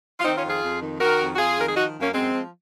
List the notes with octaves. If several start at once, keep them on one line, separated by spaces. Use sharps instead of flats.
F4
D#3 C4 D#4
C#4 F4
F2
F4 G#4
F2
D#3
D#3 F#4 A#4
F2
F#4
F2 F4 G#4
D#3 A#4
G#4
F3 D#4 F#4
F#2
A#3 C#4
F#2 G#3 C4
F3